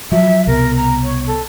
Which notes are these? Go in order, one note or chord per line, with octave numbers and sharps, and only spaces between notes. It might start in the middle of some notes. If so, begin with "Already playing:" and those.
F3 F#3 E5
C2 B2 A#4
A#5
C#5
A4